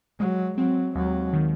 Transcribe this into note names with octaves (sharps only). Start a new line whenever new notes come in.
F#3 G#3
F#3 C4
D#2 F#3
D#3